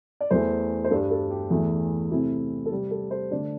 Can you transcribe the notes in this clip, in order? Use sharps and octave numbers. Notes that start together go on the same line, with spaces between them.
D5
E2 E3 A3 C5
C5
G2 G3 D4 A4
A4
G4
E2 E3 A3
C3 A3 C4 E4
A4
C3 G3 C4 G4
A4
C5
D3 A3 D4 D5